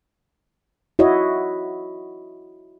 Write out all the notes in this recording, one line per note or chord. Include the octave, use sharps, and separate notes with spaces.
E4 F#4 C#5 D#5